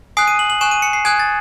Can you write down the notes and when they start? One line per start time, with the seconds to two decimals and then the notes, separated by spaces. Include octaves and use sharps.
0.17 G#5 D#6 F#6 C7
0.27 D#7
0.39 F#7
0.50 F#7
0.61 G#5 C#6 F#6 E7
0.71 D#7
0.82 C#7
0.93 C7
1.05 G#5 D#6 F#6 G#6
1.20 A6